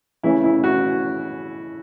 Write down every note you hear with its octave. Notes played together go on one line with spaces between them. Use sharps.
C#3 E3 A3 C#4 E4
E4
F#4